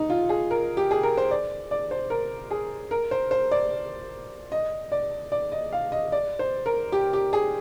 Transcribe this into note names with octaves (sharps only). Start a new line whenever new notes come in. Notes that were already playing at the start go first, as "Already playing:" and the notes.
Already playing: D#4
F4
G#4
A#4
G4
G#4
A#4
C5
D5
D5
C5
A#4
G#4
A#4
C5
C5
D5
D#5
D5
D5
D#5
F5
D#5
D5
C5
A#4
G4
G4
G#4